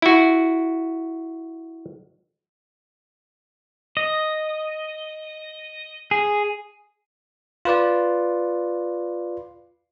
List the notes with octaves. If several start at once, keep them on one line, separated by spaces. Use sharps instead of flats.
E4 F#4
D#5
G#4
F4 B4 D5